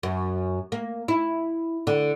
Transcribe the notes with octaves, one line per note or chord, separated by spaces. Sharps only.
F#2
A#3
E4
D3